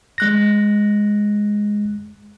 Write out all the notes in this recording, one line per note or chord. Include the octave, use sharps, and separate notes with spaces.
G#3 F#6 A#6